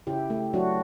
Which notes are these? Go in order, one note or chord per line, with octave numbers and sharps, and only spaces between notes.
C#3 E4 G4
A3
F#3 D4 F#4